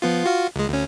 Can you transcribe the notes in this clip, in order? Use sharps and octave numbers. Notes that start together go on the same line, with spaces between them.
F3 B3 F4
F4 F#4 F5
C#2 G#3
D2 C#4